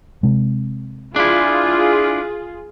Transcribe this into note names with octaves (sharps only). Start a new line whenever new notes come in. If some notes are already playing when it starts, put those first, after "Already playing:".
C3 G#3
D4 E4 F4 G#4